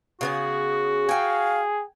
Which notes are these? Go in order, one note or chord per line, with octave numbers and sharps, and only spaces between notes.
C#3 B3 F#4 G#4
G#4 F5 G5 G#5